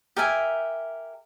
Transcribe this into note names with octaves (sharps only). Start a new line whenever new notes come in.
G4 A#4 E5 G#5